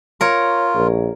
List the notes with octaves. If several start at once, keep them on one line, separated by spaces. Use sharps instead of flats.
F4 A#4 C#5
A#1